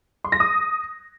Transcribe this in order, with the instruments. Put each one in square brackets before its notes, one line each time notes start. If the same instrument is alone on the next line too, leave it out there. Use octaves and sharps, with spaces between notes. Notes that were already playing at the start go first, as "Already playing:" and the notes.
[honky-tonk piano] C6
A#6
D#6